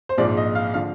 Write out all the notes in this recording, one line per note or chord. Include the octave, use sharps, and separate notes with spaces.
C5
A#1 G#2 F3 D5
D#5
F5
D3 F3 F5